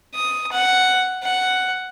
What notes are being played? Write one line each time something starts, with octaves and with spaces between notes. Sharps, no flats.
D#6
F#5
F#5